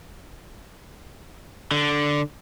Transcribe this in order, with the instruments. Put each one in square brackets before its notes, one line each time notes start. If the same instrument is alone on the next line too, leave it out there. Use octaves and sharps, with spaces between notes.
[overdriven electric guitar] D3